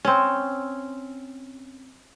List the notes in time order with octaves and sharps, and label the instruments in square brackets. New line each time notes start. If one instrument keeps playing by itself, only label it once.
[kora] C4 C#4